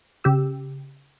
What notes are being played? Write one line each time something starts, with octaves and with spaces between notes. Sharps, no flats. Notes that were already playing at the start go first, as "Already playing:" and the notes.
C#3 G4 E6